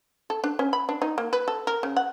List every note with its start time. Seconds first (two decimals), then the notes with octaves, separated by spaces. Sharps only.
0.30 A4
0.44 D4
0.59 C#4
0.73 B5
0.89 D4
1.02 D#4
1.18 A#3
1.33 B4
1.48 A4
1.67 A#4
1.83 C#3
1.97 F#5